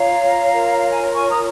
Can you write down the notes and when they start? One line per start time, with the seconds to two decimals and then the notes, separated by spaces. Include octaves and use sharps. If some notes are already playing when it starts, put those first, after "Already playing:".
Already playing: F4 C#5 F5 A#5
0.52 F4 A#4 C#5
0.78 F5
0.90 G#5
1.02 A#5
1.13 G#5 C#6
1.29 A#5 D#6